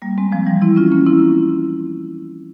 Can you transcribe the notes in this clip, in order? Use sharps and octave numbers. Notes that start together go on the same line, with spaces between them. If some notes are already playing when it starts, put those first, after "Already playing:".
G3 A#3
G#3 C4
F3 G#3
E3 G3
C4 E4
C#4 F4
A#3 C#4
C4 E4